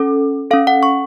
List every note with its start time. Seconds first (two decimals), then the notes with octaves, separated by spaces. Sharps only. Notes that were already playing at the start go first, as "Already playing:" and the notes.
Already playing: C#4 A4
0.51 C#4 A4 F5
0.67 F#5
0.83 C#6